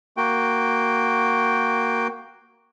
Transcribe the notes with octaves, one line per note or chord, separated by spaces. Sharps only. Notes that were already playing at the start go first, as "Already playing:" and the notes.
A#3 F#4 G5